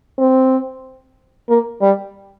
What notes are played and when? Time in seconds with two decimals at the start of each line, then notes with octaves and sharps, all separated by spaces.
0.18 C4
1.49 A#3
1.81 G3